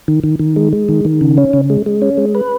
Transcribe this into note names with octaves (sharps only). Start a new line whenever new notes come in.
D#3
D#3
D#3
G#3
G#3
D#3
D#3
C#3
C#4
C#3
G#3
G#3
C#4
G#3
B4